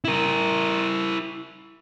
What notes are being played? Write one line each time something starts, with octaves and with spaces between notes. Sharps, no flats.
E4 A#4